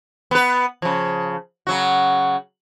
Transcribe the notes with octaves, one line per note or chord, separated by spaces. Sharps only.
B3 B4
C#3 F3
C#3 F#3 F#4